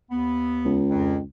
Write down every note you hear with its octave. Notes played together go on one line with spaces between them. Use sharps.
D#2 B3
C#2
F2